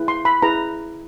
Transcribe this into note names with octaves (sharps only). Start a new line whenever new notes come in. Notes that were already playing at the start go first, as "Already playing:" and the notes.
Already playing: E4 G#4 B4
C6
B5
E4 G#4 B4 A#5